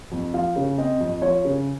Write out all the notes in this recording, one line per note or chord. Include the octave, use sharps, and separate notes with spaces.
F2
F3 F5
C#3
C4 D#5
F2
F3 C#5
C#3